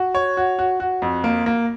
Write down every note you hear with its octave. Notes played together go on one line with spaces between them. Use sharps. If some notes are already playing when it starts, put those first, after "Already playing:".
Already playing: F#4
C#5
F#4
F#4
F#4
F2
A#3
A#3